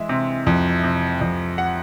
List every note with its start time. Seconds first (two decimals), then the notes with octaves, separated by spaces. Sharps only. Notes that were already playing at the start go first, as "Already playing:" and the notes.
Already playing: E3 G#3 E5
0.09 C3
0.47 F2
0.84 C3
1.21 F2
1.58 F#5